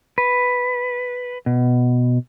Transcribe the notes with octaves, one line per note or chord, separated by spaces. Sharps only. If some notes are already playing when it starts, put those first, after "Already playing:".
B4
B2